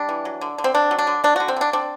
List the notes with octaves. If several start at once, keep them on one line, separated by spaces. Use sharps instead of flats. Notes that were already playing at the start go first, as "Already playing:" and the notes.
Already playing: G3 D4
E3
F#3
D3
D3
C4
C4 D4
F#3
D4
D3
A3 D4
D3 F#4
C4
D3 D4
C4 D4